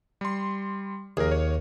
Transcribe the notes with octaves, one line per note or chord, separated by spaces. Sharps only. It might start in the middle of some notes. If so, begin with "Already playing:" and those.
G3 C6
D#2 G#4 A#4
C#5